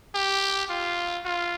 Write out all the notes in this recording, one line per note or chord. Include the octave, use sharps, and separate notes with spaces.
G4
F4
F4